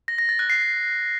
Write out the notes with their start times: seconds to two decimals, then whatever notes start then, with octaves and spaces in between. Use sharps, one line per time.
0.08 A#6
0.18 A#6
0.29 A6
0.39 F#6
0.50 C7